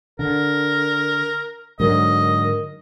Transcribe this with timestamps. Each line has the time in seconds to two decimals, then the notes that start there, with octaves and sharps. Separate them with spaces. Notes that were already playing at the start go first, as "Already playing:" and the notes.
0.19 D3 A#4
1.80 G#2 D3 F#3 A#4 D#5